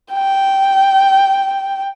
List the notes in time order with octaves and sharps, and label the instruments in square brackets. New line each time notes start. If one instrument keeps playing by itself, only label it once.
[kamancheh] G5